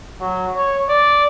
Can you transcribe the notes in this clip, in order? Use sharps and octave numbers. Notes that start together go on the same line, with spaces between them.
F#3
C#5
D5